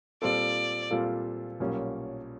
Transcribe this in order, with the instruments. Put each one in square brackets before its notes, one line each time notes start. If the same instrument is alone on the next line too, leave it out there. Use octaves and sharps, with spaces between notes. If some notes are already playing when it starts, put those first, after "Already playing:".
[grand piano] A#2 G3 C4 F4 A4 [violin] D5
[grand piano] A#2 G3 C4 F4 A4
B1 A#2 G3 A#3 C#4